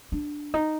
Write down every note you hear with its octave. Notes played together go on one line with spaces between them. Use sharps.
D4
D#4